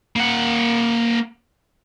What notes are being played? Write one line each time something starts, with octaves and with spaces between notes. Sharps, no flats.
A#3 F#5